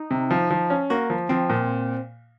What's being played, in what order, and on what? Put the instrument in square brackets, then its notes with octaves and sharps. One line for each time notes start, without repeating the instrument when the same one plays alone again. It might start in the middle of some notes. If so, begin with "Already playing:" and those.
Already playing: [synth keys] D#4
[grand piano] C3
F3
F3
C#4
[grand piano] A#3 [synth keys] F#4
[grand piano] F3
[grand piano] F3 [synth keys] C4
[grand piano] A#2